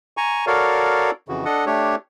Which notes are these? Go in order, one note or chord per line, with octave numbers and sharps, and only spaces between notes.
G#5 A#5 C#6
F#4 A4 A#4 C#5 D5 F5
F2 C#3 E3 F#4
D4 A4 D#5 F#5
A3 D4 G4 C#5